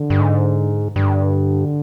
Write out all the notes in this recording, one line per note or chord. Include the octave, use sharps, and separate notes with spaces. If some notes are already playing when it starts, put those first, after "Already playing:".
Already playing: D3
G2
G#2
G2 D3